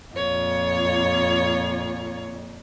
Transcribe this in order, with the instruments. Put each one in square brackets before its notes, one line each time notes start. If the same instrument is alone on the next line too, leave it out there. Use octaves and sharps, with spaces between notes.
[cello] F2 A#2 [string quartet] F4 C#5